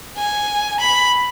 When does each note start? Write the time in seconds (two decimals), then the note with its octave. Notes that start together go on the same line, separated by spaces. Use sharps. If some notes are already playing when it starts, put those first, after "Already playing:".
0.18 G#5
0.80 B5